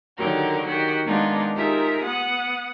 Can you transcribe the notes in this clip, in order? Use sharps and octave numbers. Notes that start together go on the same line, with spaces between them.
D3 D#3 F#3 G4 A#4
D#3 F#4 G4
D#3 G#3 B3 D4 D#4 F4
D#4 F4 G4 G#4 A#4 E5
B3 F#5 D#6